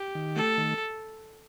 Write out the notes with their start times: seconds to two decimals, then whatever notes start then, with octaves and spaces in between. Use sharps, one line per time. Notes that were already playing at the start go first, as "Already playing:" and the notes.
Already playing: G4
0.15 D#3
0.36 A3 A4
0.58 D#3